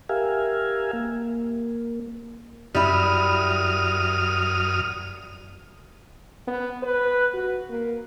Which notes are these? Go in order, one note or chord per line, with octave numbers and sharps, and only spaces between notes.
G4 A#4 E5 F5 G#5
A#3
F#2 G3 E4 D#6 F6
B3
B4
F#4
A#3